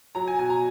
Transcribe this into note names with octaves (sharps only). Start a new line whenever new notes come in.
F#3 A#5
G#5
B2 G#5
A#5